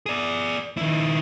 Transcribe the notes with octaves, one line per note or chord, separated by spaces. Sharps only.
G#4 D5
D#3 E4